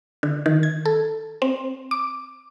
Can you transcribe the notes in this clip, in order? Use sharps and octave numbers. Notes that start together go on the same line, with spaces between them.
D3
D#3
G#6
A4
C4
D6